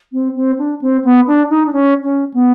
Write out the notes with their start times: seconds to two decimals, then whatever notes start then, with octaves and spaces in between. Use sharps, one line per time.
0.13 C4
0.35 C4
0.59 D4
0.81 C4
1.04 B3
1.27 D4
1.50 D#4
1.66 D4
1.73 C#4
2.03 C#4
2.34 B3